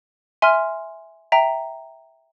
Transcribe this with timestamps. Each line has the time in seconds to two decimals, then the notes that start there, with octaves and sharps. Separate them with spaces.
0.42 E5 G#5 C6 F6
1.32 E5 G5 A#5